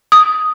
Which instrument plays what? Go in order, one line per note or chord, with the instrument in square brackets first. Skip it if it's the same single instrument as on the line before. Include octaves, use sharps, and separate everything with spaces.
[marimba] D#6